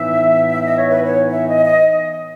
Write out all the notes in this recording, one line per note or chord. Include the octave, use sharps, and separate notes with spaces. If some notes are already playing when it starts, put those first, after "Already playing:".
Already playing: A2 E3 B3 D#4 E5
D#5
C#5
B4
C#5
E5
D#5
D#5